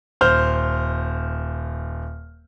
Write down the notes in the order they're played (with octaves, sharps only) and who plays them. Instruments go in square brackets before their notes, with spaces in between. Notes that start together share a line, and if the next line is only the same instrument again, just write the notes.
[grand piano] D#1 C5 F6 G6